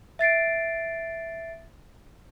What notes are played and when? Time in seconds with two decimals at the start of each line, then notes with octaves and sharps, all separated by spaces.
0.19 E5 A6 C7 D7